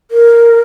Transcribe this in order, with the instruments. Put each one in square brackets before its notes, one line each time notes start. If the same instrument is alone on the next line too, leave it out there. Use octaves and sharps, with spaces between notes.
[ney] A#4